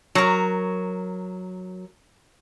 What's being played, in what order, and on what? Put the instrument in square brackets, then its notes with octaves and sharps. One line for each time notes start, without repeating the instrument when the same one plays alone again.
[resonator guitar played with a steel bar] F#3 A#4